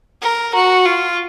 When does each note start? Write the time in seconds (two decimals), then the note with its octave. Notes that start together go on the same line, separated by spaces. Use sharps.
0.22 A#4
0.54 F#4
0.86 F4